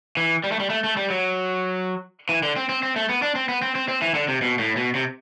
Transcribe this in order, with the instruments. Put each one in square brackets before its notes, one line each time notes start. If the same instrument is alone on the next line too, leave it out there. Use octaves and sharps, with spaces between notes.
[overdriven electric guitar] E3
G3
A3
G3
A3
A3
G3
F#3
E3
D3
C4
C4
C4
A3
B3
D4
C4
B3
C4
C4
C4
E3
D3
C3
B2
A2
B2
C3